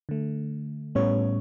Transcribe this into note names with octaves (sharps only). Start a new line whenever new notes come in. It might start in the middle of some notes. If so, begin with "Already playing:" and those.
D3 A3
A2 G3 B3 C#4 C#5